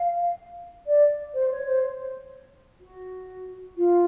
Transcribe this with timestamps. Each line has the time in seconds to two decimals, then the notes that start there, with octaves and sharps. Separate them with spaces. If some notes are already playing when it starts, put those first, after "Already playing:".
Already playing: F5
0.86 D5
1.33 C5
1.51 C#5
1.67 C5
2.80 F#4
3.76 F4